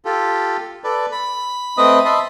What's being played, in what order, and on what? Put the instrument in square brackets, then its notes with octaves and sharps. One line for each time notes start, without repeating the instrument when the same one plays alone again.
[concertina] F4 G4 A4
A4 B4 D5
B5
A3 C4 B4 D#5 D#6
D#5 E5 A5 B5 C6